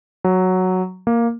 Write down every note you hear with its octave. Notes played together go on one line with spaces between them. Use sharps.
F#3
A#3